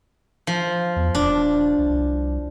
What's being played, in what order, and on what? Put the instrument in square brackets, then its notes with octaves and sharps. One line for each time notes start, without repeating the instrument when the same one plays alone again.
[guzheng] F3
[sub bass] E2
[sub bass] D#1 [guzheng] D4
[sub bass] C2